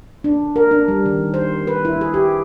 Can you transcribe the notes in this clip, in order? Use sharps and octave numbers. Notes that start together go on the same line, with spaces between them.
D4
A#4
D4
G3
D#3
C5
B4
E4
G#4
G4